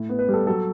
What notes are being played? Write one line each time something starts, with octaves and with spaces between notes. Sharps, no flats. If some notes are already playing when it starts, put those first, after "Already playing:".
Already playing: A2
B3
B4
G3 A4
F#3 A4